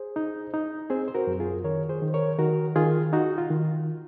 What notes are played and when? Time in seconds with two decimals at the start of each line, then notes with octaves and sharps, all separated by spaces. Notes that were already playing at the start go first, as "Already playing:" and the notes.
Already playing: G#4 C5
0.16 D#4
0.54 D#4
0.90 C4 G#4 C5
1.08 C5
1.14 F#4 A#4
1.27 F#2
1.40 F4 G#4
1.64 D#3 A#4 C#5
1.89 G#4 C5
2.02 D#3
2.14 A#4 C#5
2.38 D#3 F#4 A#4
2.76 D#3 F4 G#4
3.13 D#4 F#4
3.38 F4
3.50 D#3